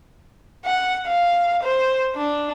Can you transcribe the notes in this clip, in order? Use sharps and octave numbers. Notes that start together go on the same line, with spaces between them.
F#5
F5
C5
D4